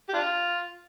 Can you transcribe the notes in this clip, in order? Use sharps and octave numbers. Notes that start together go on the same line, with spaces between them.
G4
D4 F4